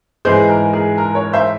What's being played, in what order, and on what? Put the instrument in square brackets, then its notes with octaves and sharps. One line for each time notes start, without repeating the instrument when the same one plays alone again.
[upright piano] G#2 E3 G#3 G#4 C5
A#4
G#4
A#4
A#4 C#5
C5 E5